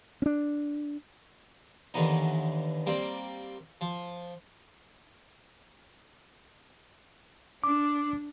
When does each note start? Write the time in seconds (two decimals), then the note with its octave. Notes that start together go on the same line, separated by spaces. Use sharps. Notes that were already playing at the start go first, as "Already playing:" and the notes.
0.22 C#4 D4
1.94 D#2 D3 E3 B3 D#4
2.86 G3 A#3 C4 D5
3.81 F3
7.64 D4 D6